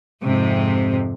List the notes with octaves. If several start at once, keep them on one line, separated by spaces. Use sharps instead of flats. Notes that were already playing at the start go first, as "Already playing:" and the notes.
F2 G#2 C3